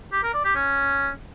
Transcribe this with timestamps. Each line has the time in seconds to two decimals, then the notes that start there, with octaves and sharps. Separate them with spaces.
0.12 G4
0.23 A#4
0.34 D5
0.44 G4
0.55 C#4